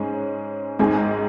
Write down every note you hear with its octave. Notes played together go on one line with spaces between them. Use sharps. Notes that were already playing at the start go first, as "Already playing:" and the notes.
Already playing: G#2 G#3 C#4
G#1 G#2 G#3 D#4 G#4